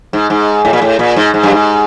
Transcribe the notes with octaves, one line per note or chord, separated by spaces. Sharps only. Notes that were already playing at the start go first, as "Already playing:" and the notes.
G#2
G#2
A2
A#2
A2
A#2
G#2
G#2
G2
G#2